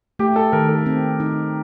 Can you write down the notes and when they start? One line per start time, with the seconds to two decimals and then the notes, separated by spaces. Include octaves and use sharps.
0.19 A3 G4
0.36 A4
0.52 D#3 A#4
0.69 A4
0.86 C4
1.20 D#4